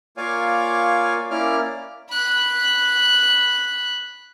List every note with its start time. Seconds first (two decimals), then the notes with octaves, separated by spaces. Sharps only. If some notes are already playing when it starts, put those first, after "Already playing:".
0.17 A#3 F4 C#5 D5 F5 G#5
1.31 A#3 C#4 E4 D5 F6
2.10 B5 F#6